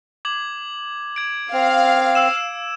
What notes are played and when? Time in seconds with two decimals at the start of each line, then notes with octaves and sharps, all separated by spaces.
0.25 D6 G#6 F#7
1.16 G#6 D7
1.53 C4 F5
2.15 E6 E7